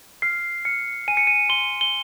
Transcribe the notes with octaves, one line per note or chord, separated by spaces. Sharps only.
F6 C7
F6 C#7
G#5 D#7
C#7
D#7
C6 G7
G7